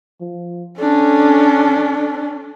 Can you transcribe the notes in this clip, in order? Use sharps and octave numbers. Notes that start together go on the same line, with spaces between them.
F3
C#4 D4 A4